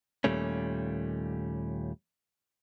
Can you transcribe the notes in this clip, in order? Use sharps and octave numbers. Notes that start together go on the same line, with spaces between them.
D#2 A#2 G3 A3 C#4